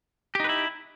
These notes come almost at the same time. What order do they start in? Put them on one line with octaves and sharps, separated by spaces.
G4 D#4 B4 E4